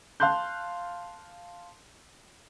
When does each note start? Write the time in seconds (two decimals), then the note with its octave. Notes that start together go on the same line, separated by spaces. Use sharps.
0.20 F5 A5 C6 F#6 G6